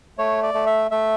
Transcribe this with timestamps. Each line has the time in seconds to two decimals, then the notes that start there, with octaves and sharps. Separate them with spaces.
0.18 A3 C#5
0.43 D5
0.54 A3
0.67 E5
0.91 A3 E5